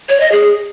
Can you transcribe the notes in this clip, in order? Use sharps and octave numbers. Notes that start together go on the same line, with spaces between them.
C#5
D#5
G#4